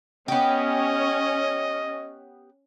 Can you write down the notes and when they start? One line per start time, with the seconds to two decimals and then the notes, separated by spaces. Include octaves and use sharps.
0.28 B3 C#4 G4 D#5